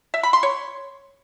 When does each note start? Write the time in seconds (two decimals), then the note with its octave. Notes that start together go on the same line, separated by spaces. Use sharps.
0.14 E5
0.23 B5
0.33 C6
0.43 C#5